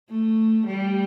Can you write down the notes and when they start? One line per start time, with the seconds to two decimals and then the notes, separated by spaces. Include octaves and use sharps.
0.10 A3
0.67 G3